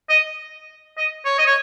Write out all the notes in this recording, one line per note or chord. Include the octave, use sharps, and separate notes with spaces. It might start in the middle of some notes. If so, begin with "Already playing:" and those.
D#5
D#5
C#5
D#5
C#5